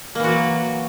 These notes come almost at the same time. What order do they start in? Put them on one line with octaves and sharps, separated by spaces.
A#3 E3 F#4 F#3